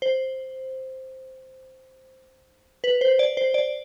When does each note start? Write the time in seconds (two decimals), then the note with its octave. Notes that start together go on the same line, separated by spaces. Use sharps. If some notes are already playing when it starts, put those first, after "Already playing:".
0.02 C5
2.84 B4
3.01 C5
3.19 D5
3.37 C5
3.54 D5